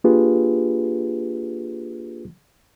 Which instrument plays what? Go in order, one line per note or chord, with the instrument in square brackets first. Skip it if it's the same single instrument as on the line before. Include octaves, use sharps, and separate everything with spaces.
[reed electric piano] A#3 D4 F4 G4 G#4 B4